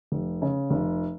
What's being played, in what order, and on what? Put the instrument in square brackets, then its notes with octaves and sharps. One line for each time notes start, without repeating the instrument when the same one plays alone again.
[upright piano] F1
C#3
F1